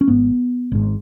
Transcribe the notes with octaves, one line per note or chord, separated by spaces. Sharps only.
C#4
G#1 G#2 B3
G#1 G#2